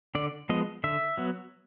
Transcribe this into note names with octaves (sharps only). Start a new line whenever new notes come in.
D3 D5
F3 G#3 B3 D#5
D3 E5
F#3 B3